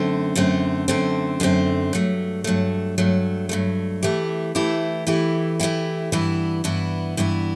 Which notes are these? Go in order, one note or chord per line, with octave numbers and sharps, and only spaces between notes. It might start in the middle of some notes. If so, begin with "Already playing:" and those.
Already playing: F#2 D3 A3 C4
F#2 D3 A3 C4
F#2 D3 A3 C4
F#2 D3 A3 C4
G2 F#3 A3
G2 F#3 A3
G2 F#3 A3
G2 F#3 A3
E3 A3 E4 G4
E3 A3 E4 G4
E3 A3 E4 G4
E3 A3 E4 G4
G2 E3 B3 E4
G2 E3 B3 E4
G2 E3 B3 E4